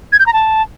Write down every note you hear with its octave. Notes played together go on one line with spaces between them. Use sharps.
G#6
G6
A#5
A5